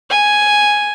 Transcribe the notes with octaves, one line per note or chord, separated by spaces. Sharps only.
G#5